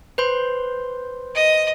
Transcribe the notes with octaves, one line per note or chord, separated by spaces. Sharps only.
B4 C5 C6
D#5